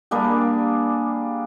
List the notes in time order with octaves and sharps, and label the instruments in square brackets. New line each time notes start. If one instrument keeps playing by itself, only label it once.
[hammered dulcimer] G3 A#3 D4 G#4